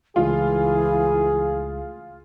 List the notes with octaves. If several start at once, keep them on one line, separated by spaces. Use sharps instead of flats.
C#2 E3 A3 F4 G#4